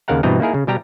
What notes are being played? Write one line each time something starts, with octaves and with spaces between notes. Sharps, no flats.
D#2 C#3 A#4 F5 F#5 A#5
G2 B2 E3 C4 D#5 A#5
A#3 D#4 E4 G#4 A#4
C#3
B2 G3 G4 A#5